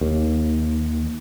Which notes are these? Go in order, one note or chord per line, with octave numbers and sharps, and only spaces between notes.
D#2